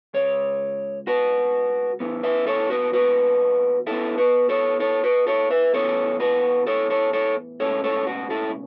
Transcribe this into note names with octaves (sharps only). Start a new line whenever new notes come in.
C#2 C#3 C#5
F#4 B4
A2 E3 B3
B4 E5
A4 C#5
F#4 B4
F#4 B4
B2 B3 E4 A4
F#4 B4
A4 C#5
A4 C#5
F#4 B4
A4 C#5
B4 E5
A2 E3 B3 A4 C#5
F#4 B4
A4 C#5
A4 C#5
A4 C#5
C#2 B2 A3 C#4 A4 C#5
A4 C#5
F#4
E4 A4